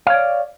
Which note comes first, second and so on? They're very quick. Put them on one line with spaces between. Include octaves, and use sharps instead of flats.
F5 C#5 D5